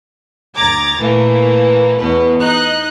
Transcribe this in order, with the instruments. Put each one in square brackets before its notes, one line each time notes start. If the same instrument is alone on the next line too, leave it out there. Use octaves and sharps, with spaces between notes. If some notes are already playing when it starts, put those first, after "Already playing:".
[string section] D2 A#5 D6 G#6 A6
A#2 E3 A3 A#3
E2 B2 B4
D#4 D#5 F#6